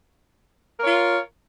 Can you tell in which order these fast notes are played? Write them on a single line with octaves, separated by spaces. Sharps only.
A#4 C#5 F4